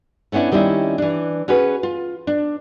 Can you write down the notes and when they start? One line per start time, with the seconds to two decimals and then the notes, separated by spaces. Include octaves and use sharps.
0.32 A3 B3 C#4 D4 E4
0.52 D#3 G3 C4 C#4 E4
0.98 E3 D4
1.48 C#4 F#4 G#4 B4
1.83 F4
2.27 D4